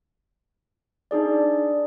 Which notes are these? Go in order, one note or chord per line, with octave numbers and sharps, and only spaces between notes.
D4 D#4 G#4 D5